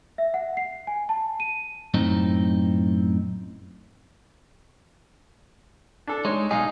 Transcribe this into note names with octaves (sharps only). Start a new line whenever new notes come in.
E5
F#5
C7
G#5
A5
D#7
F#2 A2 C4 D#4
D4 A4
G#3 D#4 C#5
B1 D#4 G#4 D#5 F5